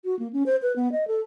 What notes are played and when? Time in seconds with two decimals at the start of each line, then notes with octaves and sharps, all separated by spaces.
0.05 F#4
0.19 A#3
0.33 C#4
0.46 C5
0.62 B4
0.76 B3
0.92 D#5
1.08 A4